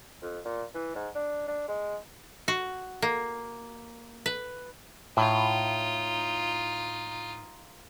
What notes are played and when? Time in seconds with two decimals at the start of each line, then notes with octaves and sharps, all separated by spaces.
0.22 F2
0.45 A#2
0.74 E3
0.95 G#2
1.15 D4
1.47 D4
1.68 G#3
2.48 F#4
3.02 A#3
4.26 B4
5.17 A2 D#4 F4